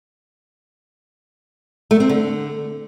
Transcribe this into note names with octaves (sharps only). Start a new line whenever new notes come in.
A3
C4
D3